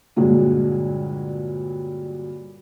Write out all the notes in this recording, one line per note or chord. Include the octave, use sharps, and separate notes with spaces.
G2 A#2 D3 F#3 G#3